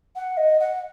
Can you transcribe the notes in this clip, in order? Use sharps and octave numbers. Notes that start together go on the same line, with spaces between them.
F#5
D#5
F#5